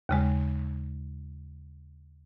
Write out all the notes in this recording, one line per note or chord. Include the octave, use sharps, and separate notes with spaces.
D#2 C#3 G#3